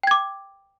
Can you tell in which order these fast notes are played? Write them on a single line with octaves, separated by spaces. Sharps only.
G5 G#6 D6